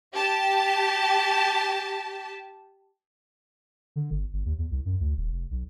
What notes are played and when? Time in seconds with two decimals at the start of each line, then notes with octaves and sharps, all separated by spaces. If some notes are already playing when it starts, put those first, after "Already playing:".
0.13 G4 A5
3.96 D3
4.11 G1
4.33 G1
4.45 D#2
4.58 E2
4.71 C2
4.85 F#2
5.00 D2
5.17 D#1
5.32 F1
5.51 B1